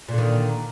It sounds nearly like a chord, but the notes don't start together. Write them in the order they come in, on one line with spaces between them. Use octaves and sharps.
A#2 D3 D#3